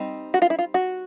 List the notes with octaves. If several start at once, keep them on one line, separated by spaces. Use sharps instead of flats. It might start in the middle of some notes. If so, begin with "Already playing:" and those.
Already playing: G3 C4 D#4
F#4
F4
E4
F4
F#4